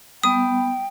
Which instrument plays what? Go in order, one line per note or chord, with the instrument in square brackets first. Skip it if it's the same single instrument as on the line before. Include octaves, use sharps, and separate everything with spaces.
[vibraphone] G3 B3 [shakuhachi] G5 [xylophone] D#6